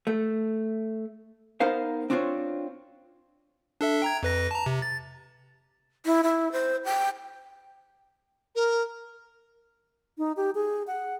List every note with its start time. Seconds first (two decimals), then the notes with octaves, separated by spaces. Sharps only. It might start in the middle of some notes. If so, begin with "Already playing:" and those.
0.07 A3
1.60 B3 D#4 A#4 C5 F5
2.10 C4 D4 F4 C5 C#5
3.81 D4 A4 E5
4.02 G5 A#5 G#6
4.23 F2 B4 A#6
4.51 A5 A#5
4.66 C3
4.82 A6
6.06 E4
6.23 E4
6.52 C5
6.85 G5
8.55 A#4
10.18 D#4
10.37 G4
10.55 G#4
10.87 F#5